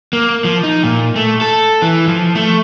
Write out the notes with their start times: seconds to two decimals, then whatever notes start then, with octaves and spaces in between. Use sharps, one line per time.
0.13 A#3
0.45 F3
0.63 D#4
0.84 A#2
1.16 A3
1.41 A4
1.82 E3
2.08 F3
2.35 A3